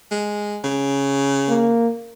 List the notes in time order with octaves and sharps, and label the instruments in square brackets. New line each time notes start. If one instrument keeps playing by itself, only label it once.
[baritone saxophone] G#3
C#3
[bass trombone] A#3